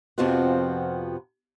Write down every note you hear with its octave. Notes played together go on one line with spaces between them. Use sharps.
F2 C3 F3 B3 F4 F#4